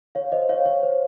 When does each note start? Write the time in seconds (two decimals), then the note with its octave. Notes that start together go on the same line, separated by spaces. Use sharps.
0.15 C#5 F5
0.32 C5 D#5
0.49 C#5 F5
0.66 C#5
0.83 C5